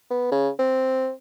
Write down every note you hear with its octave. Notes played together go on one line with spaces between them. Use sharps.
B3
C#3
C4